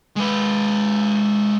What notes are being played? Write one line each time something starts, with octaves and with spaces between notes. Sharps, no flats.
G#3 B4